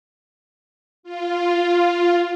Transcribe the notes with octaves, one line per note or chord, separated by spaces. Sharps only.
F4